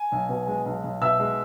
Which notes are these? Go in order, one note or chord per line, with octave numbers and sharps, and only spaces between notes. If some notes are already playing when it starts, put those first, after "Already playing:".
Already playing: G#5
B1
B2
G#3
B1
B1
B2 E5 E6
G#3